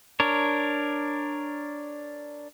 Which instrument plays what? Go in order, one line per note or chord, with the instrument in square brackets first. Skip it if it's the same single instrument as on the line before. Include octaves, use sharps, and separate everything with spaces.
[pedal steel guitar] D4 A#4 C#5